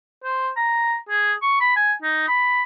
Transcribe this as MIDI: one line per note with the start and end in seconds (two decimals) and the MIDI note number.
0.24 0.50 72
0.57 0.96 82
1.09 1.33 68
1.42 1.56 85
1.60 1.72 83
1.76 1.93 80
2.03 2.23 63
2.28 2.63 83